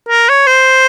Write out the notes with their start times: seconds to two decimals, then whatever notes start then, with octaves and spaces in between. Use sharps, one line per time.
0.09 A#4
0.29 C#5
0.47 C5